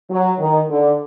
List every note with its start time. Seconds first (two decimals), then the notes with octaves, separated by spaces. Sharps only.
0.10 F#3
0.39 D#3
0.69 D3